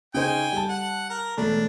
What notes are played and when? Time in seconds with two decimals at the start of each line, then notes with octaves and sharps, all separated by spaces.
0.14 C#3 D#4 C5 G5 G#5
0.52 G3 A5
0.69 F#5
1.10 A#4
1.37 E1 A3 D4